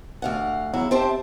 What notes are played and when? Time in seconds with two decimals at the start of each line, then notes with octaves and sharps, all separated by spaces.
0.22 D2 F5 F#5
0.73 E2 F#3 E4
0.91 C4 G4 C5 E5 A5